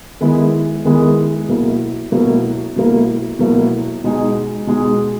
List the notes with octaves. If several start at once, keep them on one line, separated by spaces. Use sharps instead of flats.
D#3 G#3 B3 E4 G#4
D#3 G#3 B3 E4 G#4
B2 F#3 A#3 E4
B2 F#3 A#3 E4
B2 F#3 A#3 E4
B2 F#3 A#3 E4
B2 G#3 D#4 G#4
B2 G#3 D#4 G#4